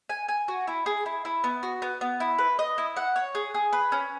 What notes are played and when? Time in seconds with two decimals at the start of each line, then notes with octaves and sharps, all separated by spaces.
0.10 G#5
0.29 G#5
0.48 F#4
0.67 E4
0.86 G#4
1.06 E4
1.25 E4
1.44 B3
1.63 F#4
1.82 B3
2.01 B3
2.20 E4
2.39 B4
2.59 D#5
2.78 E4
2.96 F#5
3.16 C#5
3.35 G#4
3.54 G#4
3.73 B4
3.92 C#4